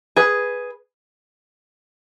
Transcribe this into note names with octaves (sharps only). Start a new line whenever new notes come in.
G#4 B4